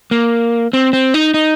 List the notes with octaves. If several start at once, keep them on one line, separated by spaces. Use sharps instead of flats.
A#3
C4
C4
D#4
D#4